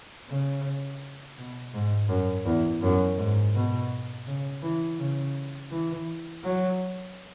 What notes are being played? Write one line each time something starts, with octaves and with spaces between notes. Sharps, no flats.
C#3
B2
G#2
F#2
E2
F#2
G#2
B2
C#3
E3
C#3
E3
F#3